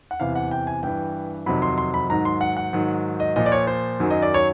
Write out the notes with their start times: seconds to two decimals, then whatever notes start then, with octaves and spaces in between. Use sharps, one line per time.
0.11 F#5
0.20 E2 C3 E3 F5
0.36 F#5
0.51 G5
0.67 G#5
0.83 G2 E3 G5
1.46 F2 C3 D#3 F#3 B5
1.62 C6
1.78 C6
1.94 B5
2.09 G#2 D#3 F#3 A#5
2.25 C6
2.41 F#5
2.57 F#5
2.73 G#2 D#3 F#3
3.20 D#5
3.36 A#2 F3 D#5
3.46 D5
3.52 C#5
3.67 C5
4.00 F#2 D#3 F#3
4.11 D#5
4.22 D5
4.34 C#5